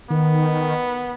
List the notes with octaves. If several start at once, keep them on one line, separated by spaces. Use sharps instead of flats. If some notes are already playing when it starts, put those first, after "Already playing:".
D#3 B3